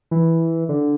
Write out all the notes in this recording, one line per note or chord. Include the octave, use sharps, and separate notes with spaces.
E3
D3